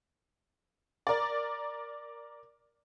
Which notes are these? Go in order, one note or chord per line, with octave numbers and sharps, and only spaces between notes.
A#4 D5